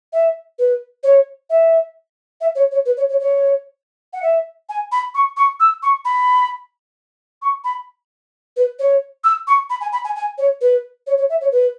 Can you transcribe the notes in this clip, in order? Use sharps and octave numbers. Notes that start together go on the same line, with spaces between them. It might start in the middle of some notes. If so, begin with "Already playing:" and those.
E5
B4
C#5
E5
E5
C#5
C#5
B4
C#5
C#5
C#5
F#5
E5
G#5
B5
C#6
C#6
E6
C#6
B5
C#6
B5
B4
C#5
E6
C#6
B5
G#5
B5
G#5
G#5
C#5
B4
C#5
C#5
E5
C#5
B4